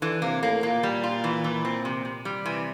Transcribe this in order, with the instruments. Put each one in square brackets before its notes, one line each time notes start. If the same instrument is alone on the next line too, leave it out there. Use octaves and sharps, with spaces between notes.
[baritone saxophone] D3 [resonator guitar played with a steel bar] E3
[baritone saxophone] C3 [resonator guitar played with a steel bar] A#3
[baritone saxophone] A2 [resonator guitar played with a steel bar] A#3
[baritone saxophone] A#2 [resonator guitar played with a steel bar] A#3
[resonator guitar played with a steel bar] G3
F4
E3
E3
C4
C3
C3
G3
[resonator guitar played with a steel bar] C3 [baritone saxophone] E3